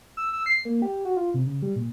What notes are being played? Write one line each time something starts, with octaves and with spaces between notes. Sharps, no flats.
E6
E6
C7
A#3
G4
F#4
F4
C3
C#3
G3
A#2